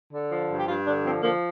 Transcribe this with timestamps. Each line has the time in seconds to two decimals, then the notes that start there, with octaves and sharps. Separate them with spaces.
0.12 D3
0.31 F3
0.50 G2
0.58 G4
0.67 G2 F4
0.86 D3 D4
1.04 F3 C4
1.23 F3 A#3